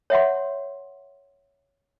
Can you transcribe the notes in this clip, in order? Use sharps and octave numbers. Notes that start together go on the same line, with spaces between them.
C#5 E5 F#5 C6